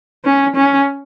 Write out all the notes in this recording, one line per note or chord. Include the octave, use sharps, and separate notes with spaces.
C#4
C#4